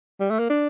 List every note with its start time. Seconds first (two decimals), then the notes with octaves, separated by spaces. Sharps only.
0.20 G3
0.30 A3
0.39 A#3
0.50 D4